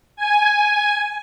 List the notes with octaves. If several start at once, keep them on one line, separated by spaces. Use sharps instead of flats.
G#5